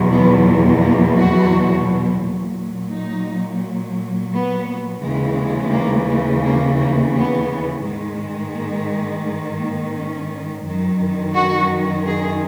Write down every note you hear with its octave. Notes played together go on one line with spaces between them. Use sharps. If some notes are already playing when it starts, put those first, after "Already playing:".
Already playing: E2 B2 F#3
B3
A#3
F#4
A#2 F#3
D#4
B3
D#2 C#3 E3 G#3
A#3
G#3
A#3
A#3
B3
G#2 D#3 G#3
A#3
G#3
A#3
C#4
F#2 D#3 F#3
F#4
G#4